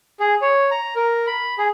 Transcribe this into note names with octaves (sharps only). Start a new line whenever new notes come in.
G#4
C#5
A#5
A#4
B5
G#4